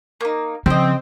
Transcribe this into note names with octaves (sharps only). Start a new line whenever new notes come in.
A#3 D#4
C#3 F3 C4 D#5 G5